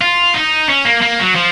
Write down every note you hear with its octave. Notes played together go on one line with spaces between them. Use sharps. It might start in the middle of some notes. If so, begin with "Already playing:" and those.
F4
D#4
C#4
A#3
A#3
F#3
F3